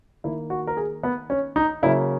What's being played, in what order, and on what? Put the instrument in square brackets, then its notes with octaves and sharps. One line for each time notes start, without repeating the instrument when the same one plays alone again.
[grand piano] D#3 A#3 E4
F#4
A#4
G#4
B3
C#4
D#4
C#3 F#3 A#3 E4